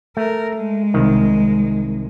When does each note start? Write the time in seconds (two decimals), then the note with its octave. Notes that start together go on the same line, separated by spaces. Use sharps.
0.17 A3 A#4
0.55 G#3
0.94 C2 D#3